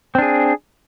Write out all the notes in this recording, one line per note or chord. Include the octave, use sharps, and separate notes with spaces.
C4 D4 G#4